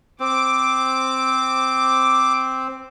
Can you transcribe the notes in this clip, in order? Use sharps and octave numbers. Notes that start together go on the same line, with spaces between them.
C4 D6